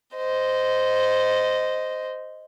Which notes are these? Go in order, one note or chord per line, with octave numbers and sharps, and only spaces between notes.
C5 D#5